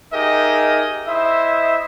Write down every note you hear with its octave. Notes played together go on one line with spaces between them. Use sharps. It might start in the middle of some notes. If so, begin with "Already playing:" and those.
D#4 G4 G#4 A#4 D#5 E5
E4 C5 D#5 E5